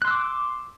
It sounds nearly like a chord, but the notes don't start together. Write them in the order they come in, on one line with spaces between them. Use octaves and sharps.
F#6 C6 E6 D6